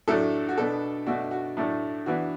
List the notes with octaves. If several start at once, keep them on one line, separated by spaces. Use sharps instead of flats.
A2 F#3 A3 D4 A4
F#4
B2 B3 D4 A4
B2 A3 D4 F#4
F#4
A2 F#3 A3 D4
E3 B3 D4 F#4